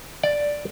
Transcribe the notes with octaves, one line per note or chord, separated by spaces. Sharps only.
D5